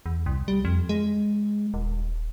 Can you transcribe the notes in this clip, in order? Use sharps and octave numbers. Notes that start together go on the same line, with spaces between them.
E2
C2
G3
F2
G#3
D#1